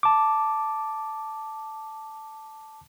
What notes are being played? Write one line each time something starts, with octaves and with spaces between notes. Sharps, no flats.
A5 D6